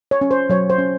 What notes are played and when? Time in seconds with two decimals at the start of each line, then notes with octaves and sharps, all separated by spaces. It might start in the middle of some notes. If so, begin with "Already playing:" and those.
0.11 C#5
0.21 C#4
0.31 C5
0.50 F#3 C#5
0.70 C5
0.78 C#4